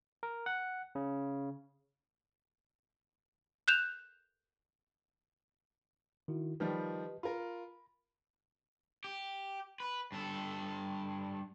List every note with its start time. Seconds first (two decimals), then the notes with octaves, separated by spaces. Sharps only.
0.23 A#4
0.46 F#5
0.95 C#3
3.68 F#6 G6 E7 F7
6.28 D#3 E4 F#4
6.60 D#3 F3 G3 G4 B4 D#5
7.23 F4 A#4 B5
9.04 G4
9.80 B4
10.12 G2 A4